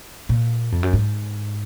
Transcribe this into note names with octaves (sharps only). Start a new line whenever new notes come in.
A#2
F2
F#2
G#2